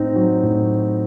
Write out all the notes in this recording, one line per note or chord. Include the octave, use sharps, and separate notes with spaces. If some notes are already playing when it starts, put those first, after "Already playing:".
Already playing: A2 C4 D#4
F#3
A2